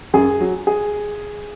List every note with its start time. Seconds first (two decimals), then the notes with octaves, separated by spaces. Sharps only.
0.14 F#2 G#4
0.40 F#3
0.67 G#4